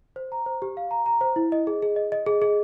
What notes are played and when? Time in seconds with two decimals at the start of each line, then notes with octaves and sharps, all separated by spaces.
0.16 C5
0.32 A#5
0.46 C5
0.62 G4
0.77 F5
0.91 A#5
1.06 A#5
1.21 C5
1.36 E4
1.52 D#5
1.67 G#4
1.82 G#4
1.96 D#5
2.12 D#5
2.26 G#4
2.42 G#4